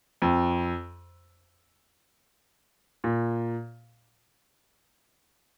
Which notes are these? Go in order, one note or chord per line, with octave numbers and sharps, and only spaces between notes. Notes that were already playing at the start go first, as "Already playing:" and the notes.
F2
A#2